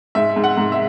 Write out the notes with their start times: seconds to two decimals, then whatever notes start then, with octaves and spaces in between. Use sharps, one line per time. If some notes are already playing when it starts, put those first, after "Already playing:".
0.15 G#2 E5
0.36 G#2
0.44 F#5
0.57 G#2
0.72 E5